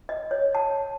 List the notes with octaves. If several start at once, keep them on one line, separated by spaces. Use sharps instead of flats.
D#5
C#5
A5